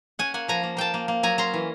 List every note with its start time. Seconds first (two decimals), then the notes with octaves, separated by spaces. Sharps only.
0.19 C#4 F#5 G#5
0.34 A#3 F#5 G#5
0.48 F3 G#5 A#5
0.63 A#3
0.77 A#3 G5 A5
0.94 A#3
1.08 A#3
1.23 F#3 G#5 A#5
1.38 C#4 A#5 C6
1.54 E3